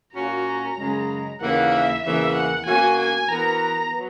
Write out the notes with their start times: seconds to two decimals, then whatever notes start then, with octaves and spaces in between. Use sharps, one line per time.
0.15 A#2 A#3 C#4 F#4 A#5
0.78 F#2 C#3 G#3
1.41 D#2 C#3 E3 A#3 F#5
1.72 E5
2.03 E2 C#3 E3 A#3 E5
2.35 F#5
2.66 B2 A#3 C#4 F#4 G#5
2.98 G#5
3.28 E3 B3 F#4 A#4 A#5
3.91 F#3 B3